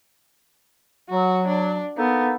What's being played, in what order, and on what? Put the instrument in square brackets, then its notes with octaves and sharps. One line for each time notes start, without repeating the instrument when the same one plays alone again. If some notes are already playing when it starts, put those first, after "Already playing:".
[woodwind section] F#3 [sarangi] F#4
[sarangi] D4
[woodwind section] A#3 D#4 A4 [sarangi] B3